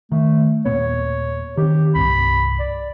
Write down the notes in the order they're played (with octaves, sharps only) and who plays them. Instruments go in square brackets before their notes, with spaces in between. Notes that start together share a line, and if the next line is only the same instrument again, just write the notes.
[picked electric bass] D#3 [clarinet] A3
[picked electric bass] D#1 A#2 B3 [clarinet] C#5
[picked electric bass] D#3 C4 [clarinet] G4
[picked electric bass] C2 G2 [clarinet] B5
[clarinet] D5